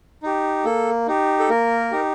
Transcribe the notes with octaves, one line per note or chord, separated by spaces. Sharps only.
D#4 G4
A#3 A4
D#4 G4
A4
A#3 A#4
D#4 G4